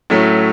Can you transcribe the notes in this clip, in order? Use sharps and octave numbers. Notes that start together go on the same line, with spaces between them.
A2 F#3 A3 C#4